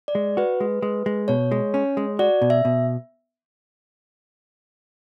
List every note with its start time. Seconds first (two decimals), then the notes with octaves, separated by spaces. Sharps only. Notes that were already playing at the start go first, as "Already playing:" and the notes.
0.08 D5
0.15 G#3
0.37 F#4 B4
0.60 G#3
0.82 G#3
1.06 G#3
1.28 B2 C#5
1.52 G#3
1.74 C#4
1.97 G#3
2.19 F#4 D5
2.42 B2
2.50 E5
2.65 B2